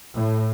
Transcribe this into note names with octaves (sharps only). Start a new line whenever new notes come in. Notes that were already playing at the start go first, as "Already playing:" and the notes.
A2